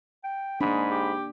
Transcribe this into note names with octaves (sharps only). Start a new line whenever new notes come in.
G5
G#2 A#3 D4 G#4 B5
G4